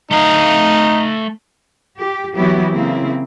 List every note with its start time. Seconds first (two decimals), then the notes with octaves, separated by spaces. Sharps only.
0.11 A3 D#4 F5
2.00 G4
2.36 E3 F#3 B3 E4 F#4 G4
2.72 C#3 A#3 C4 E4